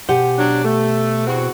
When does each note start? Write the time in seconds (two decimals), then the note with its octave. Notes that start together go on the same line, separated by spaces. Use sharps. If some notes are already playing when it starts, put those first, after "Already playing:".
0.09 B2 G4 C5 F#5 G#5
0.39 F#3 D4
0.64 A3
1.27 E2 C4 F#4